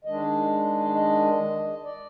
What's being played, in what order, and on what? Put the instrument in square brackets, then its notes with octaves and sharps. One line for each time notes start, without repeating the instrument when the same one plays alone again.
[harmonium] D#3 G#3 D4 D#5
D#5
D5